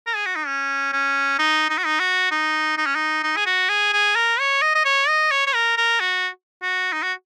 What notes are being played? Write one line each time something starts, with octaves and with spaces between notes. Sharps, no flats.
A#4
G#4
F#4
D#4
C#4
C#4
D#4
D#4
F#4
D#4
F#4
D#4
D#4
C#4
D#4
D#4
G#4
F#4
G#4
G#4
A#4
C#5
D#5
D#5
C#5
D#5
C#5
C#5
A#4
A#4
F#4
F#4
D#4
F#4